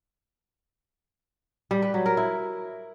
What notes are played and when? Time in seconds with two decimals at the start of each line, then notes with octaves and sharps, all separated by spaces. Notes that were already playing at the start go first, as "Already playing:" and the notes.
1.71 G3
1.82 B4
1.94 F#3
2.06 A#4
2.17 E4